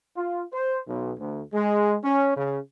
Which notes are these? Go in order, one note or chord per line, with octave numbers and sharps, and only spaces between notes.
F4
C5
B1
D2
G#3
C#4
C#3